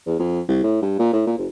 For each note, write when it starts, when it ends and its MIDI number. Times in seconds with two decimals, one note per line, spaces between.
0.06 0.16 40
0.20 0.41 41
0.48 0.63 36
0.64 0.81 45
0.82 0.97 43
0.99 1.11 46
1.13 1.22 45
1.27 1.35 46
1.38 1.47 30